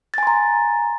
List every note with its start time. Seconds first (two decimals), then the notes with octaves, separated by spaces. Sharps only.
0.14 A6
0.18 G#5
0.23 C6
0.27 A#5